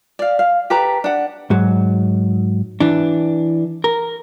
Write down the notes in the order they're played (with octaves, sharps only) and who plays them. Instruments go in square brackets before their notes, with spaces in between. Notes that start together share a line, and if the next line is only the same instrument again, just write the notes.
[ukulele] D5 F5
F5
G4 A4 B4 A#5
D4 F#5
[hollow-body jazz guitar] G#2 F#3
E3 D4
A#4